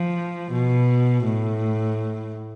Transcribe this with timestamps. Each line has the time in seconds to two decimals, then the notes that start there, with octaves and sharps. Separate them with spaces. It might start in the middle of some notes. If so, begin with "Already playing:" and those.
Already playing: F3
0.52 B2
1.25 A2